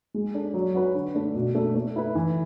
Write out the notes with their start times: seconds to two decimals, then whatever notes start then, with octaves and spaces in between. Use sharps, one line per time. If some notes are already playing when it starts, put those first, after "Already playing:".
0.14 G#3
0.34 D4 A4
0.54 F#3
0.74 C#4 F#4 B4
0.95 D3
1.14 A3 D4
1.35 B2
1.55 A3 D4 A4
1.75 A3
1.96 E4 B4
2.15 E3